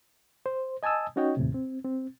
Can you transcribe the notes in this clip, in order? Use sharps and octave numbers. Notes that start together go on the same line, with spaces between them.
C5
D#5 G#5 A5 D#6 E6
C#4 D#4 F#4 C#5 D#5 G5
D#2 A2 C3
C4
C4